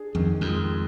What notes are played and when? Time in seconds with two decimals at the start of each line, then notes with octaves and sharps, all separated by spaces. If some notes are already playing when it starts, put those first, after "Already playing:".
Already playing: D4 G#4
0.15 F2 D#3
0.41 F2
0.47 G#3